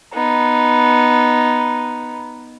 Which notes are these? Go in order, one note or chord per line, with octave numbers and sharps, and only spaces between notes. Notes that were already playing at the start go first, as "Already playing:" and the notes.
B3 D#4